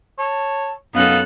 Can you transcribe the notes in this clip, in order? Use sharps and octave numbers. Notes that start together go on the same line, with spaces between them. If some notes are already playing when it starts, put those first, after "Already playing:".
C#5 A5
F#2 B3 C#4 D#4 A4 F5 F#6